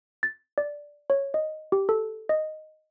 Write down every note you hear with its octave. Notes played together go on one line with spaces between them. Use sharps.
A6
D5
C#5
D#5
G4
A4
D#5